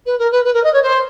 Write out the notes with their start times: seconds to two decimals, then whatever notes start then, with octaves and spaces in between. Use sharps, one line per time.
0.05 B4
0.18 A#4
0.31 B4
0.44 B4
0.53 A#4
0.63 D#5
0.73 C#5
0.82 C5